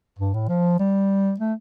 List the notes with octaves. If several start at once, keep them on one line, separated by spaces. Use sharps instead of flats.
G2
A2
F3
G3
A3